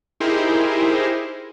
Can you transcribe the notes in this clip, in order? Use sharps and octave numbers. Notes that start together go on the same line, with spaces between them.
D#4 E4 G4 G#4 A#4 C5